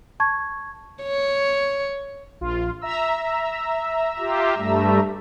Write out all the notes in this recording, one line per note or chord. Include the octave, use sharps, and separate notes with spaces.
A5 C#6 G#6
C#5
A#1 F4
E5 A#5 E6
F4 G4
G2 G3 A3